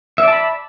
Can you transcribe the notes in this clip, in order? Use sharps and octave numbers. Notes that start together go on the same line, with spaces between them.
D5 E5 A5 B5